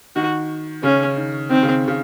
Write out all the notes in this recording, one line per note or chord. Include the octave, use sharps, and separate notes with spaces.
D#3 F#4
C#3 C#4
D#3
D#3 C4
C#3
C#3